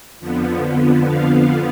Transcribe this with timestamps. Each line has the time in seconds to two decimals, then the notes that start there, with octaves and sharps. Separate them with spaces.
0.20 F2 D3 F3 B3
1.07 F5
1.36 F5